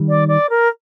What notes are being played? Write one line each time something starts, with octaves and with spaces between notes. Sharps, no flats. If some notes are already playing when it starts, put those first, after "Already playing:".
Already playing: D#3 G3
D5
D5
A#4